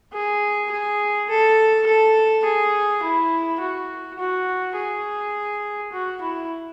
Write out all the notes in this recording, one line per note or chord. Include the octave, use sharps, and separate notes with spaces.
G#4
G#4
A4
A4
G#4
E4
F#4
F#4
G#4
F#4
E4